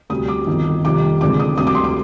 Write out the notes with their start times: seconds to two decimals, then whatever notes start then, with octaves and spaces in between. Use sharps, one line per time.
0.10 D2 C3 G3 D#6
0.28 D6
0.47 G1 F2 D#3
0.84 F1 F2 D#3 G3 D6
1.21 F1 F2 D3 G#3 D6
1.40 D#6
1.58 D2 C3 G3 D#6
1.67 D6
1.75 C6
1.84 D6